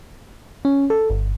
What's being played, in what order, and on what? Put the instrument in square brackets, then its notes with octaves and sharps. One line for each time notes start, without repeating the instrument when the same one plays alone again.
[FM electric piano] C#4
A4
G1